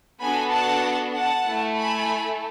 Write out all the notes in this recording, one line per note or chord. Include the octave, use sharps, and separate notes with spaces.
B3 D4 F#4 A4 G#5 B5
F#5 A5
F#5 A5
A3 E4 A4
G#5 B5